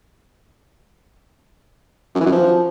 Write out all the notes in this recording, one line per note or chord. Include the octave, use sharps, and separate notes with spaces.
F#2
E3
F#2
F3